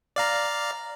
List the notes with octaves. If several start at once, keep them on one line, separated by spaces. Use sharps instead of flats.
D5 F5 A#5